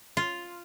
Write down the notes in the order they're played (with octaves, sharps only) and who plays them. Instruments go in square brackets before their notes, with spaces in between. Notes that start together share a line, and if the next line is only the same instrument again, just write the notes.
[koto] F4